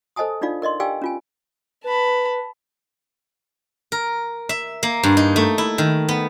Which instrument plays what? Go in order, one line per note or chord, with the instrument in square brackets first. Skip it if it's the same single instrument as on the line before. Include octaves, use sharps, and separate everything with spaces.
[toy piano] A4 C5 D#5 G#5 A5 D#6
D4 D#4 F4 D5 F5
A#4 D5 D#5 C6
G4 D5 F5 G5 G#5 E6
C#4 F4 G#5
[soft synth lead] B4 [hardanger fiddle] A5 B5
[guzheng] A#4
E5
A#3
G2
D#4
A3
E4
D#3
B3